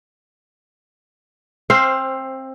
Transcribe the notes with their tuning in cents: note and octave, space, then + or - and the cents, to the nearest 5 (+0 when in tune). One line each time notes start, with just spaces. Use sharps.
C4 +20 C5 +5 F5 -10